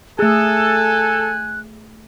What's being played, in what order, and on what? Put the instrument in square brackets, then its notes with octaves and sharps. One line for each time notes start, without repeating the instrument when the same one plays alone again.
[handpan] A3 G#4 [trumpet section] A4 [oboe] G#5 [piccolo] F#6